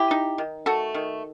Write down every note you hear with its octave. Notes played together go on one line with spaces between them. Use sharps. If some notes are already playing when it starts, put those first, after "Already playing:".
Already playing: E4 G4
D#4
D#3
A3 F#4 A4
D#3